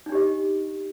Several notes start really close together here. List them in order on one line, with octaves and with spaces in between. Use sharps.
D#4 D4 G4 D#5